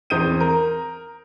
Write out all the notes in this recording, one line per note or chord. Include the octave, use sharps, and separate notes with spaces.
E2 C4 D#6 G6 D#7
A#4